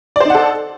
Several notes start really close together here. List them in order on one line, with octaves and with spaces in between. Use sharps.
D5 C5 D#4 F#5 A4